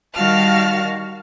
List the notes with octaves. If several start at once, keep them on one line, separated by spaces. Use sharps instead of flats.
D#3 G3 F#4 F5 A5 F6